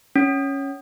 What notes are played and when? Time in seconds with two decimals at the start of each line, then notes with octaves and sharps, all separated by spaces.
0.16 C#4